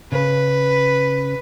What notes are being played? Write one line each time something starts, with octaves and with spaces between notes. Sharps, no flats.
C#3 B4